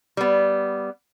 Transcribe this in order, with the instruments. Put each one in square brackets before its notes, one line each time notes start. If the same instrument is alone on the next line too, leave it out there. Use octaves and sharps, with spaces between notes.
[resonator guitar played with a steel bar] G3 B3